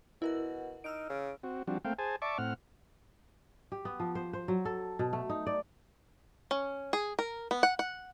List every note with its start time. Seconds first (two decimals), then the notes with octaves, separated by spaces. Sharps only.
0.22 B2 E4 A#4 F#5
0.84 D#4 E6 F6 D7
1.09 C#3
1.43 C4 F#4
1.67 F3 G3 C4 D4 F#4
1.85 A3 A#3 C4 F5 G5
1.99 G#4 C5 G#5 A5
2.22 D5 E5 A5 C#6 D6
2.38 A2 C4 F#5 F6
3.72 G4
3.85 B3
4.00 F3
4.15 C5
4.33 C5
4.48 F#3
4.65 A4
4.99 B2
5.13 A3
5.29 D#4
5.47 D5
6.51 C#4
6.93 G#4
7.19 A#4
7.51 B3
7.63 F#5
7.79 F#5